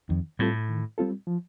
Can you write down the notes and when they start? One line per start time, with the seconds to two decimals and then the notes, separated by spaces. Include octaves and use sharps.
0.09 F2 D#3
0.39 A2 G3 C4 F4 A4
0.69 D#3
0.98 G3 C4 F4 A4
1.27 F3